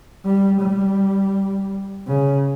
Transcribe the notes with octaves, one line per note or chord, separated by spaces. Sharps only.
G3
G3
C#3